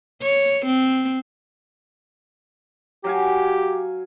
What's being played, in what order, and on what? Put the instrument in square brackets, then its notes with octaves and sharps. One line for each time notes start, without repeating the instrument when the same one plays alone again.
[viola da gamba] C#5
C4
[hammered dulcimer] F#3 F5 G#5 [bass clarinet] G4